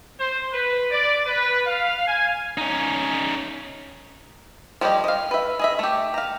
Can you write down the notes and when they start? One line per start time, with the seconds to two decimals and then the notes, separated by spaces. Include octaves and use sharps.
0.20 C5
0.52 B4
0.91 D5
1.26 B4
1.66 F5
2.07 G#5
2.58 C#4 D#4
4.81 F3 G3 G4 C#5 D#5
5.04 D#5 F5
5.31 B4 E5
5.59 G#4 D#5 E5
5.79 A3 G4
6.14 F5 A#5